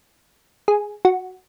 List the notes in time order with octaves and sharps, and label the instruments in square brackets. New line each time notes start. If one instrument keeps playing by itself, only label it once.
[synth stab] G#4
F#4